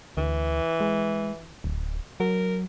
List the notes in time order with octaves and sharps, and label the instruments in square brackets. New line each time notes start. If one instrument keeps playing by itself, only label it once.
[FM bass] D2 [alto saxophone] E3
[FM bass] G#3
D1
[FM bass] F#3 [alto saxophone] A#4